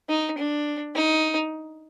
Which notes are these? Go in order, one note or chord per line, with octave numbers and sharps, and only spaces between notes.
D#4
D4
D#4